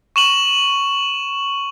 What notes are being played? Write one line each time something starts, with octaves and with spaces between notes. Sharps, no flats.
C#6 E7 F#7